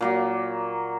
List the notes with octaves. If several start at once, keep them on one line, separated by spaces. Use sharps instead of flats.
A#2 F#3 A#3